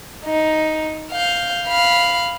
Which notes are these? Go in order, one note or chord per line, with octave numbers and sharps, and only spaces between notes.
D#4
F5 G6
F5 B5